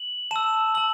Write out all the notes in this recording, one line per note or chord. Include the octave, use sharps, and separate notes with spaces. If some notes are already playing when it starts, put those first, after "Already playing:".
Already playing: F#7
A5 E6 E7
A5 E6 F#7